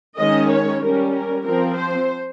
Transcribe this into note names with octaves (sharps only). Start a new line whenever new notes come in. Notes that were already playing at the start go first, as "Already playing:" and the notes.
D#3 G#3 C#4 D#5
C#5
G3 C#4 A#4
A#4
F3 C4 A#4
C5